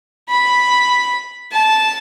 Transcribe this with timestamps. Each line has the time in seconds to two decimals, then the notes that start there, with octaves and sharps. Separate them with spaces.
0.29 B5
1.52 A5